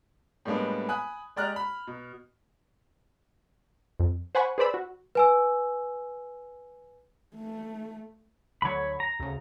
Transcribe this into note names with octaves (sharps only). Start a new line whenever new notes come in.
A2 G3 G#3 A#3 B3 D4
G#5 B5 D#6 F#6
G#3 G4 D5 A#5 F6 F#6
B5
B2
F2
C5 F#5 G#5 B5 C#6
G#4 B4 C5 D5 B5 E6
F#4
B4 G#5 E6
A3
D2 D3 F#3 C#5 B5
A#5
D2 C#3